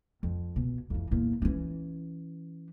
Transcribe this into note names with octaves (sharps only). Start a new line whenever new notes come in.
F2
B2
F2 E3
E2 A#2
E3 C#4